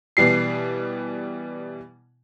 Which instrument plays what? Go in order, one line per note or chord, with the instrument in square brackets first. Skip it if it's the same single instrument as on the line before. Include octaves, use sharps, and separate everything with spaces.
[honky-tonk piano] B2 E3 G3 C7